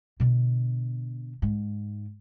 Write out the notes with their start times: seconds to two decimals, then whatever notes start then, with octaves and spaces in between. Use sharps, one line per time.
0.20 B2 D3
1.42 G#2